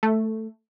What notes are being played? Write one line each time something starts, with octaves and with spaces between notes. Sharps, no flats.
A3